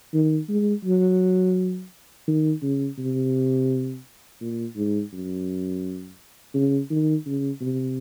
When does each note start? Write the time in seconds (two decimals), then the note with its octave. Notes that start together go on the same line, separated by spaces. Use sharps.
0.14 D#3
0.49 G#3
0.85 F#3
2.28 D#3
2.63 C#3
2.99 C3
4.41 A#2
4.76 G#2
5.13 F#2
6.54 C#3
6.90 D#3
7.26 C#3
7.62 C3